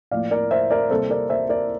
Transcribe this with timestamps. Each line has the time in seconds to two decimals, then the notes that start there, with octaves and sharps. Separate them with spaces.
0.11 A2 F3 A#3 D5 F5
0.31 A#4 D5
0.51 C5 E5
0.71 A#4 D5
0.90 C3 G3 A#3 A4 C5
1.10 A#4 D5
1.29 C5 E5
1.49 A#4 D5